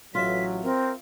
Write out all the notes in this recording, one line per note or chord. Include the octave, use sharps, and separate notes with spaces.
A1 F#3 F4 E5 B6
C4 A#4